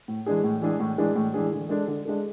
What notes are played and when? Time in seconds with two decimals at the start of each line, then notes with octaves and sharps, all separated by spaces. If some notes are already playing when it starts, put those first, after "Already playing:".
0.08 A2
0.26 E3 G#3 D4 G#4
0.44 A2
0.62 E3 G#3 D4 G#4
0.80 A2
0.98 E3 G#3 D4 G#4
1.16 A2
1.34 E3 G#3 D4 G#4
1.51 D3
1.69 G#3 D4 A4
1.88 D3
2.05 G#3 D4 A4